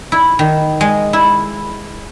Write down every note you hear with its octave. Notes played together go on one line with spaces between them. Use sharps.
E4
D#3
G#3
E4